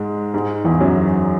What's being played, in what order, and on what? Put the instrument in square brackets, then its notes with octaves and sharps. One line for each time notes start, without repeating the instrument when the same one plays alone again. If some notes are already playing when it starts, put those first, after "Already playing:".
Already playing: [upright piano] G#2 G#3
G#2 G#3
E2 E3
F#2 F#3